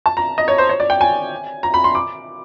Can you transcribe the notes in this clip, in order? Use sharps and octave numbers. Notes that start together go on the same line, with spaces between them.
A5
A#5
D#5
C#5
C5
C#5
D5
G5
G#5
A#5
B5
C6
D6